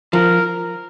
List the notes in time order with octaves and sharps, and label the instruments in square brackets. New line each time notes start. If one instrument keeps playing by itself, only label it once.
[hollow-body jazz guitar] F3 [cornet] A#4